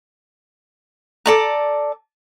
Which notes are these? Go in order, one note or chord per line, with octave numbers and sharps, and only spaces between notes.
A4 D5 A#5